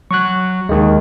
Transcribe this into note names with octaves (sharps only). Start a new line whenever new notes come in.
F#3 C#6 F#6
D#2 D#3 G#3